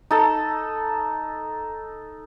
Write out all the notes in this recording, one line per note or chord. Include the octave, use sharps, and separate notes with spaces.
D#4 A4